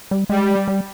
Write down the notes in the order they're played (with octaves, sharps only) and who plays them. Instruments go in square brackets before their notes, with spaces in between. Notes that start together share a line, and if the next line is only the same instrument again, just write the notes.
[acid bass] G3
[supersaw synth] G3 [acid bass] G#3
[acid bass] G3